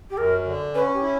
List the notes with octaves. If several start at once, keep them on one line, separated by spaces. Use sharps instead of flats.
G4
F#2 A#4
D3
C#4 B4
G4
E4